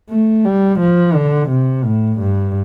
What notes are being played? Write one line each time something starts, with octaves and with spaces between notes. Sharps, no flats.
A3
G3
F3
D3
C3
A2
G2